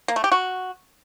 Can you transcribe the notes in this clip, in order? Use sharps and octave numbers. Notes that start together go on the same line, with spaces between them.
A#3
A3
G4
F#4